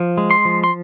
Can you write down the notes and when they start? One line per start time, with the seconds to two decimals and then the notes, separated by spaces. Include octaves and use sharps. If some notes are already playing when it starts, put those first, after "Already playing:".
Already playing: F3
0.18 G#3
0.31 C6
0.45 F3
0.64 C6